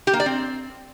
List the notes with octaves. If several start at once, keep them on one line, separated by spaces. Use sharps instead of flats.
G4
A#3
D5
C4